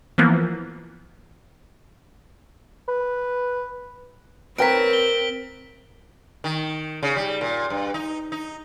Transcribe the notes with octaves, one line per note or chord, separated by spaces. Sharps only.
E3 F3 A#3 B3
B4
C4 A#4 B4 C#5 G5 A#5 B6 D7
G7
D#3
C#3
G3
A#2
G2
D#4
D#4